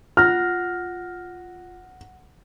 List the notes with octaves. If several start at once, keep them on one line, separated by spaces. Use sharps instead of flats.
F4 F#5 F6 F#6 A#6